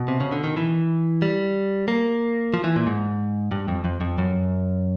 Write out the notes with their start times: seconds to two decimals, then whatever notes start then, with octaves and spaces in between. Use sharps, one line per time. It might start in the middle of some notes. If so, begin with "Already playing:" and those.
Already playing: B2
0.08 C3
0.20 C#3
0.32 D3
0.44 D#3
0.57 E3
1.22 G3
1.88 A#3
2.54 F3
2.64 E3
2.76 A#2
2.87 G#2
3.51 G2
3.68 F2
3.85 F2
4.01 F2
4.18 F#2